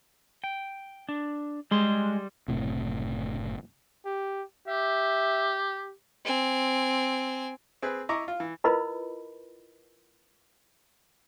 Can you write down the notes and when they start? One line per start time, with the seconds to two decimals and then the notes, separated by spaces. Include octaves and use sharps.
0.44 G5
1.09 D4
1.71 G3 G#3 C6
2.48 F#1 A2 C3
4.05 G4
4.68 G4 E5
6.25 C4 G#5
7.82 C4 G#4 B4
8.09 E4 D#5 A#5 C#6 D6
8.28 F4
8.40 E3
8.64 E4 F4 A#4 B4 D#5 B5